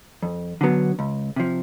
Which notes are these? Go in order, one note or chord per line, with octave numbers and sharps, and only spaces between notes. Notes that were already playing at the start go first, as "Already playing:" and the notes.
F2
D3 F#3 B3
C#2
C3 F3